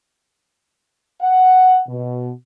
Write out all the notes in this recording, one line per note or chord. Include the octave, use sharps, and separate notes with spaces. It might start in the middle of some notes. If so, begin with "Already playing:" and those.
F#5
B2